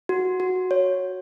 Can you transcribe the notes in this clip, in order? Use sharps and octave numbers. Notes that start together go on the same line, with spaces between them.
F#4
F#4
C#5